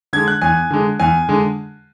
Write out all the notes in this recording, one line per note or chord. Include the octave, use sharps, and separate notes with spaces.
D3 G#3 G#6
F#6
E2 G#5
D3 G#3
E2 G#5
D3 G#3